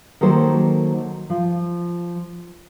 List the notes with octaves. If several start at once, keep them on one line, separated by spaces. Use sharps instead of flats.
D#3 F#3 A#3 A4 C5
F3